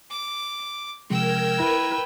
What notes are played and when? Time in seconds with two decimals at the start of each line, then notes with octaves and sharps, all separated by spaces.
0.11 D6
1.10 C3 F3 G#3 A#4 G5 E6 G#6
1.60 E4 B4